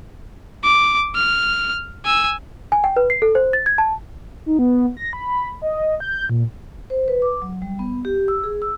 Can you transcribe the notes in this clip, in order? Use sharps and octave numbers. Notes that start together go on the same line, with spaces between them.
D6
F6
G#5 E6
G#5
G5
B4
C7
A4
C5
A6
G#6
A5
D#4
B3
A#6
B5
D#5
G6
A#2
C5
B4
D6
F#3
G3
B3
G4
E6
G#4
E6